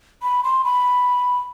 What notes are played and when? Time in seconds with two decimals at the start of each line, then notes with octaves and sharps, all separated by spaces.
0.23 B5
0.44 C6
0.64 B5